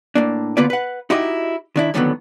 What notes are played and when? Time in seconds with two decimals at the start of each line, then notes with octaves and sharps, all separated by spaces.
0.15 A2 A#3 D4
0.57 D3 A#3 B3 F4 B4 D5
0.70 B4 F#5
1.10 D#4 E4 F#4 G4 D#5
1.76 D#3 D4 E4
1.94 F2 A2 D3 D#3 F#3 B3